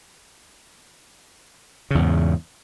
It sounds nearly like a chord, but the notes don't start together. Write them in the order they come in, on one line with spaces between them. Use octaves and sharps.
C#3 E2 G#2